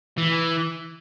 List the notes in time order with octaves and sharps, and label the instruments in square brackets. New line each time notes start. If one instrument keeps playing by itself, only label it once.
[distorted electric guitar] E3